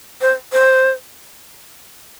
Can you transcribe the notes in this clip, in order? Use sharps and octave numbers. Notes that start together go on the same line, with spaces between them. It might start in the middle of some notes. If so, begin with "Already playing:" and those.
C5
C5